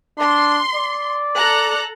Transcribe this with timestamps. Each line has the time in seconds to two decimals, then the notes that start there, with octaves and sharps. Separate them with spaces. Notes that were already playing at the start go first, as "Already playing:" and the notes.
0.19 D4 C6
0.75 D5
1.36 A4 A#5 F#6